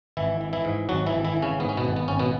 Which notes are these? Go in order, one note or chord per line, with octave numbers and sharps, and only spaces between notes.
G#1 E3 E4
E3
E3 E4
G#2
G#1 F#3 F#4
E3 E4
G#1
E3 E4
E3
C#3 C#4
G#2 B3
C#4
B2 B3
G#1
B3
G#1 C#4
B2 B3